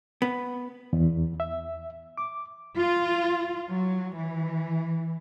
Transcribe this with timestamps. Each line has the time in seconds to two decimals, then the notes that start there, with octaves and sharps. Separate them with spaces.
0.22 B3
0.93 E2
1.40 E5
2.18 D6
2.78 F4
3.68 F#3
4.14 E3